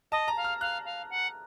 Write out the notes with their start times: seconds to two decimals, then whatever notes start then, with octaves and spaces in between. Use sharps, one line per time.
0.11 D#5 A5
0.28 A#5
0.36 F5
0.44 F6
0.60 F5 F#6
0.85 F5
1.09 F#5